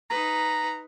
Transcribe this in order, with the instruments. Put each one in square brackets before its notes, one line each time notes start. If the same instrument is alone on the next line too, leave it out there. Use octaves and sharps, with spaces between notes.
[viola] D#4 B4 [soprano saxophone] A#5